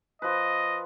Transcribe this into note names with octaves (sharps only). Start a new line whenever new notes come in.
F3 B4 D#5